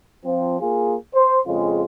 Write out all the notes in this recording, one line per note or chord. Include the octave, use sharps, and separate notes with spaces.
F3 C4
A#3 F4 G#4
C5
F2 C#3 G#3 F4